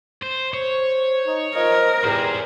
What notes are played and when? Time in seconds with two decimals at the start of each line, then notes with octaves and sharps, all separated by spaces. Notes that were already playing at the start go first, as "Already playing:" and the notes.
0.23 C5
0.54 C5 C#5
1.27 D#4
1.56 F3 A#4 D#5
2.05 E2 G4 G#4 C5